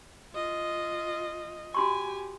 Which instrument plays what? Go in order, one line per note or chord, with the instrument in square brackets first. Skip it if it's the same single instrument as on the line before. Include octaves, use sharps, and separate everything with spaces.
[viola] F4 D#5
[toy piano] F#4 C6 C#6 [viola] G4 G#5